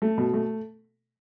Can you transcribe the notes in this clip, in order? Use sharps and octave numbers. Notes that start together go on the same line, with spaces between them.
A3
B2
A3